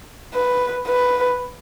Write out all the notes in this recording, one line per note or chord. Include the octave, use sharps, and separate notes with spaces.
B4
B4